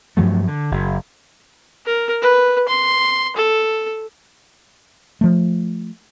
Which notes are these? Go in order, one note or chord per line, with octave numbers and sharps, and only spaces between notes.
G2 F3 F#3 A3
D3
F#1
A#4
B4
C6
A4
F3 A3